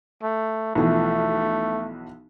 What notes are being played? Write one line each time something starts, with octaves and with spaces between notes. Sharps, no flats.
A3
B1 E3 F3 A3